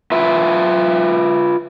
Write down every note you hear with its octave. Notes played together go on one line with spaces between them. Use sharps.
F4 B4 E5